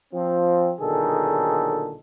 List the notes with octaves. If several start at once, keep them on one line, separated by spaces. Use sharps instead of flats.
F3 C4
B1 A#2 D3 D#3 G#4 A4